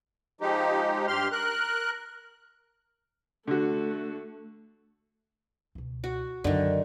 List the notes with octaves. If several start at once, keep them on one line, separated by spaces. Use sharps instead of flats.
F3 G#3 D#4 G4
G2 G4 C6 F6
A#4 F#6
D3 A3 F#4
C#2 B2
F#4
F#2 D3 D#3